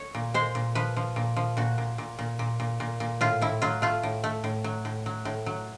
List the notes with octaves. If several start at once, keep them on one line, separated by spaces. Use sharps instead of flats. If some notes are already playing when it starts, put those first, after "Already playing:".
Already playing: C#5
A#2
G#3 C5
A#2
F3 B4
F3
A#2
F3
A#2 F#4
A#2
A#2
A#2
A#2
A#2
A#2
A#2
A2 F4
A2 E4
F#3 F4
A3 F4
A2
A3
A2
F#3
A2
F#3
A2
F#3